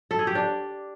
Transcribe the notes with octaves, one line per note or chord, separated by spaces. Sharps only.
A4
G#4
G4
D4